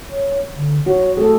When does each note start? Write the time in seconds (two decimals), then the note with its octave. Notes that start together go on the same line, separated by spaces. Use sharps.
0.10 C#5
0.56 D3
0.86 F#4 C#5
1.17 A3 G#4 A4